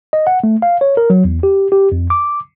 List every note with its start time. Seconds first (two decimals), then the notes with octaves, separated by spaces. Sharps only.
0.13 D#5
0.27 F#5
0.44 A3
0.62 F5
0.81 C#5
0.97 A#4
1.10 F#3
1.25 E2
1.43 G4
1.72 G4
1.92 F2
2.10 D6